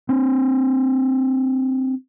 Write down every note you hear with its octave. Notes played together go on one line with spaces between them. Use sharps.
C4 D4